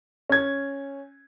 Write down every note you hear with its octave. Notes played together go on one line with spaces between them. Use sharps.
C#4 G#6